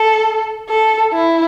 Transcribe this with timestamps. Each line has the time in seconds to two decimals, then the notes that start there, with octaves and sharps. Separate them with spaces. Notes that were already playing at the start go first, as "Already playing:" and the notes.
Already playing: A4
0.69 A4
1.13 E4